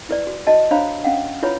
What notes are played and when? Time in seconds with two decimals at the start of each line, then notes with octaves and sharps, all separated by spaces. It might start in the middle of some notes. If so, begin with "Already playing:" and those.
0.09 E4 B4 D5
0.27 F#4
0.47 F#4 D#5 A5
0.71 D4 C5 C#5 F5 A#5 B5
1.04 C#4 F5 F#5
1.42 E4 F4 B4 C#5 B5